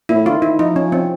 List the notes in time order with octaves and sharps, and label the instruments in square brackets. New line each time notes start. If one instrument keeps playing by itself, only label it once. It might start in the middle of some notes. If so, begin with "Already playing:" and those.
[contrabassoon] A#2 [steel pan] E4
[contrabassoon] A2
[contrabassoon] D3 [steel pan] F4
[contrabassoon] D#3 [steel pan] E4
[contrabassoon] F3 [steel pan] D#4
[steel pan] C#4
C4